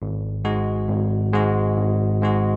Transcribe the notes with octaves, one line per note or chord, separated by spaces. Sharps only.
G#1
G#2 G#3 F#4
G#1
G#2 G#3 F#4
G#1
G#2 G#3 F#4